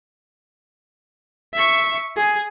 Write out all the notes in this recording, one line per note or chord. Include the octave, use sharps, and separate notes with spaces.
E5 C#6
G#4